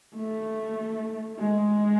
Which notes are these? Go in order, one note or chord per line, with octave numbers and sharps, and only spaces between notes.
A3
G#3